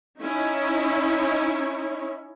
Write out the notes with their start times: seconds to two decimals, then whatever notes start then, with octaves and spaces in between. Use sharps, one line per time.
0.17 C#4 D#4 E4 C#5